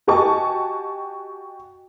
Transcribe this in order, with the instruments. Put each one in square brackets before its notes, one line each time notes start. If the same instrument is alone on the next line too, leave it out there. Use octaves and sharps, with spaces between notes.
[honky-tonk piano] F#4 G4 D#5 G#5 A5 C#6